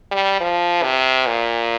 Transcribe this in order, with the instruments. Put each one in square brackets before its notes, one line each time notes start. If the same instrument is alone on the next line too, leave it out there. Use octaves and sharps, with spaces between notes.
[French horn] G3
F3
C3
A#2